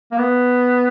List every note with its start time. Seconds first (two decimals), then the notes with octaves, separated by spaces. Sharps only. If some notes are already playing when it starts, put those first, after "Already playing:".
0.12 A#3
0.18 B3